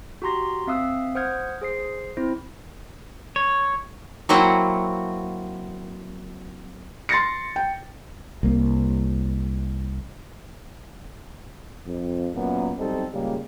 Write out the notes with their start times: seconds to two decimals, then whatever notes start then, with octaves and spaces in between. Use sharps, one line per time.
0.22 F#4 G4 A#5 C6 A#6
0.67 C4 E5 F5 D#6 E6 F#6
1.15 C5 F#5 D#6 F6 G6 G#6
1.62 G#4 C5 C7
2.17 C4 E4 C5 A#6
3.36 C#5
4.29 F#3 A#3 C4 E4 F#4
7.09 C6 A6 A#6 C#7
7.56 G5
8.43 C2 A#3
11.86 F2
12.34 F#2 A#2 A#3 B3
12.78 B1 G3 C4 D#4 A4
13.12 A#2 C#3 G3 G#3 A#3